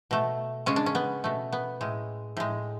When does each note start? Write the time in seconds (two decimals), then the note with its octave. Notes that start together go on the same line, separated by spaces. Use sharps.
0.11 B2 A3
0.66 C#3 G#3 C#4
0.76 D4
0.86 C#4
0.95 B3
1.24 B2 A3
1.53 B3
1.81 A2 G#3
2.37 A2 G#3